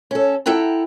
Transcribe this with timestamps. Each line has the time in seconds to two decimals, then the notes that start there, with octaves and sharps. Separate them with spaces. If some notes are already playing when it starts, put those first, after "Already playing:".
0.11 C#4 A4
0.46 E4 A4 F#5 G5 A#5